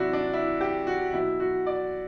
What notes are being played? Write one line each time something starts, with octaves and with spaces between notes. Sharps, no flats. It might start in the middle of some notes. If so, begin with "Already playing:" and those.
Already playing: C3 F#3 D4 E4 F#4
D4
E4
G4
F#4
B2 F#3 E4
F#4
D5